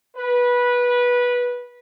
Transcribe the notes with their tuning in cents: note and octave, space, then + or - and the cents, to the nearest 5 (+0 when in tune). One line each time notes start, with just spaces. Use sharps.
B4 -15